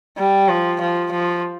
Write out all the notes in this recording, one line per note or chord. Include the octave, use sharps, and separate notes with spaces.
G3
F3
F3
F3